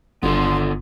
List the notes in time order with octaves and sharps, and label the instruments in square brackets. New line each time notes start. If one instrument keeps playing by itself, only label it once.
[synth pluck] G1 [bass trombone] D3 [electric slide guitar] B3 F4 A4 [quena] C6